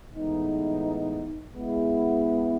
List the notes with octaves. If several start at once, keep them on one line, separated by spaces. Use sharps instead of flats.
A2 E3 G#3 B3 D#4
G#3 B3 E4